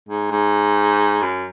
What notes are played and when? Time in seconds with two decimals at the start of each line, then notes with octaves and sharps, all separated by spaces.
0.09 G#2
0.31 G#2
1.22 F#2